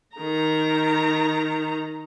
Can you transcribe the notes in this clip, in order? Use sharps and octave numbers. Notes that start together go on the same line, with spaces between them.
D#3 A#5